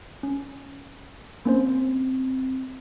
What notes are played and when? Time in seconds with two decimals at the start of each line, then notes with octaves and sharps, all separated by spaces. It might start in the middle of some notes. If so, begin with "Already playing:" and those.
0.23 C#4
1.45 A#3 C4 C#4 C5